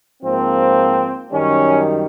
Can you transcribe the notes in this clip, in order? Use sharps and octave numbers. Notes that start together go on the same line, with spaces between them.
G#2 F3 A#3 C4
F#2 D#3 G3 C#4